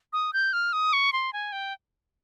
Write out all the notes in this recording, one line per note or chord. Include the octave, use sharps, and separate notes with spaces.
D#6
G6
F6
D#6
C#6
C6
G#5
G5